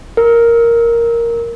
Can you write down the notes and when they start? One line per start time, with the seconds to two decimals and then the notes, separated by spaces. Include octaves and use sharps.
0.17 A#4